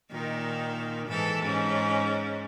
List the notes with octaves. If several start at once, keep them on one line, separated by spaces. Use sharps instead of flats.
A#2 D#3 D#4
G#2 E3 A4
G#2 C#4